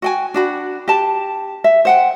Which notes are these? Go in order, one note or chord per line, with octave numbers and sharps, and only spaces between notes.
F#4 G5 G#5
D4 F#4 B5
G4 A5
E5
C5 F#5 G5